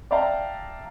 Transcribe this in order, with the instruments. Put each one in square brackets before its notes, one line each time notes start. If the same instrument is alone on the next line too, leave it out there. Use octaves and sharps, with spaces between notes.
[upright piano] D5 E5 F5 G5 A5 A#5